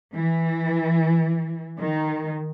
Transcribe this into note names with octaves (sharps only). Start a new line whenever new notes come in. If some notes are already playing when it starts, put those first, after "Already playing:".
E3
D#3